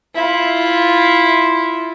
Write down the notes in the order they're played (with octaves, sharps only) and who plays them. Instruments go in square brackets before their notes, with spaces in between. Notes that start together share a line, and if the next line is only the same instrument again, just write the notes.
[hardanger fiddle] E4 F4